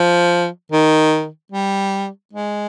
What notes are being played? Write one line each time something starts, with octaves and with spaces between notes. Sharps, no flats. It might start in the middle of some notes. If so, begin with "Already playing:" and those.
Already playing: F3
D#3
G3
G#3